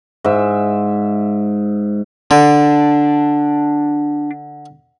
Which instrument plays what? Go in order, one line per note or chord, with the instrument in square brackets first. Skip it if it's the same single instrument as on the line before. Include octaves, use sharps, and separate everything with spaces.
[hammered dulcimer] G#2 E5
[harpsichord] D3 [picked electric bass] D4